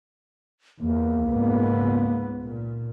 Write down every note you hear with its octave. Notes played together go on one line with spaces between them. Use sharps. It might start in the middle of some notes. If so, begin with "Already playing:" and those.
E2 A#3
C#2 G#2 B3
A#2